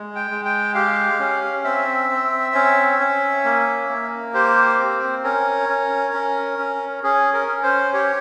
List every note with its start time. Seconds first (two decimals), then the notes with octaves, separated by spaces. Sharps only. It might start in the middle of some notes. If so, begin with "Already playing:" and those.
Already playing: G#3
0.15 G5
0.31 G#3
0.45 G5
0.74 G4 F5
1.20 C#4
1.64 C4 E5
2.10 C4
2.54 C#4
2.99 C#4
3.44 A#3
3.89 A#3
4.34 G4 C5
4.79 C4
5.24 C#4 A#4
5.69 C#4
6.14 C#4
6.59 C#4
7.03 C#4 G#4
7.33 A#4
7.48 C#4
7.63 C5
7.94 G4 C#5